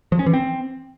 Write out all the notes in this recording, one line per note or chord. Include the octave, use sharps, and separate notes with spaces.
F3
C#4
E3
C4